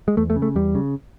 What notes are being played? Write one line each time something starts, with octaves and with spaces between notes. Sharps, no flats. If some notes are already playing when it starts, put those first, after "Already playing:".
G#3
E2 A3
A3
C#3
A3
E2 G3
C#3